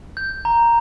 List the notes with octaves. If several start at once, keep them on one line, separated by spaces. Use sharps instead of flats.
G6
A#5